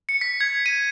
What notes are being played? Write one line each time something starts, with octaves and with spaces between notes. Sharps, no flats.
C#7
B6
G#6
D#7